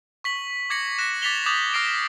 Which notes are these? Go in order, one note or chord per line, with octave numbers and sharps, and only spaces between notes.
C#6 B6 F#7
D6 G#6 A#6 C#7 F#7
F#6 A#6 E7
D6 A6 B6 C#7 F7 G7
D6 D#6 G6 A6 F#7
D6 F6 A#6 C7 D7